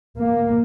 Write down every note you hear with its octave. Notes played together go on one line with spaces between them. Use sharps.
A#3